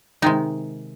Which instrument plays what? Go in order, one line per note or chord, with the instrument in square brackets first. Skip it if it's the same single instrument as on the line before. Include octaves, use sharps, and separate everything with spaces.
[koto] C3 D#3 G#3 D#4